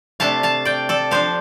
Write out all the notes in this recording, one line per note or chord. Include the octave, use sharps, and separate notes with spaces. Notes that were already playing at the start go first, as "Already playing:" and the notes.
C3 A3 D4 F5 A5
F5 A5
D5 G5
A4 D5
F3 D4 C5 F5